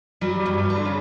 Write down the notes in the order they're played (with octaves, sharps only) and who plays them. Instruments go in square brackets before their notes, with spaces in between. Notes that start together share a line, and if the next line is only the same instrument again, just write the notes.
[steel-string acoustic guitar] F#3 [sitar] G3
[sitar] G3
[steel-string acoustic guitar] G2
[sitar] G3
[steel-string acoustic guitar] D4
[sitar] D3
C#3